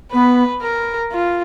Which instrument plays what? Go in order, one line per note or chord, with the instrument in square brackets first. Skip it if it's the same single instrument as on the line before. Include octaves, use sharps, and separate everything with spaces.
[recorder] B3 [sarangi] B4
[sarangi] A#4
F4